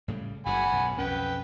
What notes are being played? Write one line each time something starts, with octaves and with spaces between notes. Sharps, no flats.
A2 C#3 G3
F#1 F#2 F#5 G#5 B5
B1 F#2
B1 F2 C#4 B4 G5